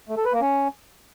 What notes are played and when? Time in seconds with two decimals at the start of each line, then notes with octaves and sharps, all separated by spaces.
0.09 A3
0.17 A4
0.25 B4
0.33 A#3
0.41 C#4